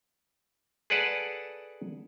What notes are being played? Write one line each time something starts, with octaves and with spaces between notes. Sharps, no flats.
G#4 A4 B4 D5 F#5 A5